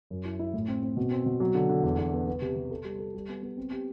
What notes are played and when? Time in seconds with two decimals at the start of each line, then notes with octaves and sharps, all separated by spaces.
0.10 F#2
0.25 E4
0.39 E4
0.53 A2
0.68 C4
0.83 C4
0.97 B2
1.11 C4
1.26 B2
1.40 F#3
1.55 D3
1.69 D3
1.83 E2
1.99 E2
2.13 B3
2.27 B3
2.42 C3
2.56 C3
2.71 A4
2.85 G3
2.99 A4
3.15 G3
3.29 B3
3.43 B3
3.57 C4
3.72 G4